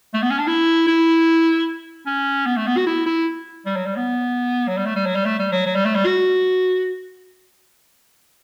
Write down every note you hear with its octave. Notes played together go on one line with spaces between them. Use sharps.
A3
B3
C#4
D4
E4
E4
C#4
B3
A3
B3
F#4
E4
E4
G3
F#3
G3
B3
F#3
G3
A3
G3
F#3
G3
A3
G3
F#3
F#3
G3
A3
G3
F#4